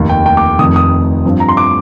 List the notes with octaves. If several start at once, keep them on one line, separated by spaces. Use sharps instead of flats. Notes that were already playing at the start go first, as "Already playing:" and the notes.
Already playing: F1 D#2 D#3
G5
G5
D6
F1 F2 D#3 D#6
D#6
G2 F3 C4
A#5
C6
D6